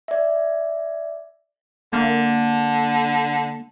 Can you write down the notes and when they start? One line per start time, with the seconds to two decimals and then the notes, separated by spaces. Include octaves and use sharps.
0.08 D5 E5
1.93 D3 A#3